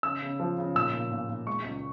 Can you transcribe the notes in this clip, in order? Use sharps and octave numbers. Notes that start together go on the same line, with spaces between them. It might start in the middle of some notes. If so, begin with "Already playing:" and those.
C#3 E6
C#3
F3
C#3
A#2 E6
A#2
A#2
A#2
G#3 C#6
C#2